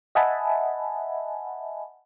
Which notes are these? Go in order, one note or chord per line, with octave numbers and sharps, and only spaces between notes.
D#5 E5 F#5 G#5 A5 B5